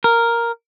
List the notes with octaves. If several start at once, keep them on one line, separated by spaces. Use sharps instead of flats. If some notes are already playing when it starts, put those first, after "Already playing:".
A#4